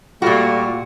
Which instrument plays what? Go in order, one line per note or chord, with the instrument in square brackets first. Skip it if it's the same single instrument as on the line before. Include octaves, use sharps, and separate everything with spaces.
[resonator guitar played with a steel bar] A#2 F#4 [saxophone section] G3 A3 F4